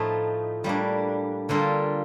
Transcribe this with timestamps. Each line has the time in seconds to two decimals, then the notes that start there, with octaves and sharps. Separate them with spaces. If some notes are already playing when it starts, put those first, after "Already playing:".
Already playing: A2 F3 A3 D#4
0.64 A2 G3 A#3 D4
1.49 D3 G3 A#3 F4 A4